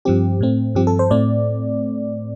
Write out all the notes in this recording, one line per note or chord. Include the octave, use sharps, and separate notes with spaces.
G2 F3 C4 G4
A2 A3 C4
G2 F3 C4 G4
A4
C5
A2 A3 C4 D5